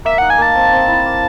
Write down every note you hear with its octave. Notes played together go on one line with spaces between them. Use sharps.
A#3 E5
D#4 F#5
G#5
A#3 A5
C4
C4
E4
A#3